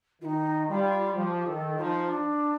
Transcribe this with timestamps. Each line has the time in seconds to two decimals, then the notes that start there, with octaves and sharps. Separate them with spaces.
0.21 D#3 D#4 F4
0.69 G3 F4
1.15 F3 G4
1.46 D#3 A4
1.77 F3 D#4 F4
2.09 D4